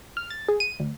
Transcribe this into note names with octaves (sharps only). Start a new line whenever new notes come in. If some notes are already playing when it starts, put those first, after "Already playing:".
F6
A6
G#4
D#7
D2